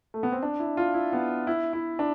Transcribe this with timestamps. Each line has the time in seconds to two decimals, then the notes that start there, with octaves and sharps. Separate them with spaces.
0.14 A3
0.23 B3
0.32 C4
0.43 D4
0.60 E4
0.77 F4
0.94 E4
1.13 B3
1.47 E4
1.73 E4
1.99 D4